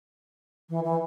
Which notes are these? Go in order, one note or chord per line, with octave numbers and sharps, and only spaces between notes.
E3
E3